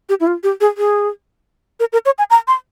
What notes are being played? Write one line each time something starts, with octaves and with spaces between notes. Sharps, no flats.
G4
E4
F4
G4
G#4
G#4
A#4
A#4
C#5
G#5
A#5
C6